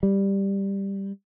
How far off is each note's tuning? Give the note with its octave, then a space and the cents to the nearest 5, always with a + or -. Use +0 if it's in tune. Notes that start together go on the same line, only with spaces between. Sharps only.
G3 +5